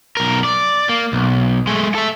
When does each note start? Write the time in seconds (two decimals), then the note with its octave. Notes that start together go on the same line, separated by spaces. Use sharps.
0.17 B1 A#4
0.44 D5
0.89 A#3
1.13 B1
1.67 G#3 A3
1.95 A4 E5